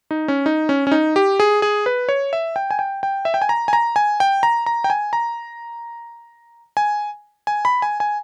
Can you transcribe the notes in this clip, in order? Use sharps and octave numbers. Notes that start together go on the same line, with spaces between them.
D#4
C#4
D#4
C#4
C#4
D#4
G4
G#4
G#4
B4
C#5
E5
G5
G#5
G5
G5
E5
G5
G#5
A#5
G#5
A#5
G#5
G5
A#5
A#5
G5
G#5
A#5
G#5
G#5
B5
G#5
G#5